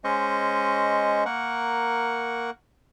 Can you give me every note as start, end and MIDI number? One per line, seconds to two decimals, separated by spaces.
0.04 1.24 56
0.04 1.24 61
0.04 1.24 72
0.04 1.24 75
0.04 1.24 85
1.25 2.50 58
1.25 2.50 70
1.25 2.50 78
1.25 2.50 85